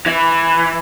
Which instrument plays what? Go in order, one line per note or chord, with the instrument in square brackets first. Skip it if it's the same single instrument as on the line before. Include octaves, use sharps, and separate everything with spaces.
[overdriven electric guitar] E3